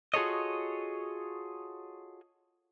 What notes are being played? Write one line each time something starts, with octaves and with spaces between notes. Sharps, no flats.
F4 F#4 G#4 A4 C#5 D#5